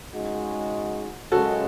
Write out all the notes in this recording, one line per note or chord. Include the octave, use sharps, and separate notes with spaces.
C#3 G#3 D#4 F#4
F#2 C#3 G#3 F#4 A4